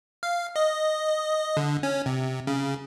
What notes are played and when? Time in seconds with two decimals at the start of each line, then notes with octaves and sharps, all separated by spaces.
0.23 F5
0.56 D#5
1.57 D3
1.83 C#4
2.06 C3
2.47 C#3